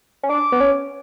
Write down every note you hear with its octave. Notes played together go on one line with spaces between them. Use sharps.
C#4
D4 D6
B3
C#4